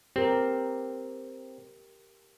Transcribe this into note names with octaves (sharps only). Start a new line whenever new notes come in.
C4 G4 A#4